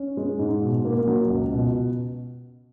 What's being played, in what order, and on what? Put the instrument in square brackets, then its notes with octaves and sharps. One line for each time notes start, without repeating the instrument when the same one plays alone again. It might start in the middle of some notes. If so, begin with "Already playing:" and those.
Already playing: [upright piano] C#4
G#3
G#2
B2
A#3
F#3
C#2
B2